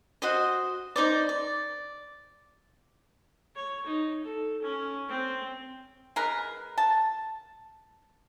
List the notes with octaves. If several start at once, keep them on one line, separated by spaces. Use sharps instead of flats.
F#4 C5 D#5
D#4 C5 D5
D5
C#5
D#4
A4
C#4
C4
G#3 A#4 B4
A5